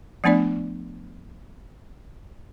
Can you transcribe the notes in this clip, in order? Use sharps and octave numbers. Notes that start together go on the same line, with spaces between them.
F3 A3 B3 D4 D5